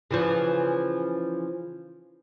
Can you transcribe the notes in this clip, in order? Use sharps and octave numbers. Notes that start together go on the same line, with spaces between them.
C#3 E3 F3